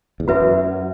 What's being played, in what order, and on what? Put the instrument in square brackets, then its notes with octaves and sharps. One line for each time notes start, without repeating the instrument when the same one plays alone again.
[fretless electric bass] E2
[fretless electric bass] F#2 [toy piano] F#4 B4 E5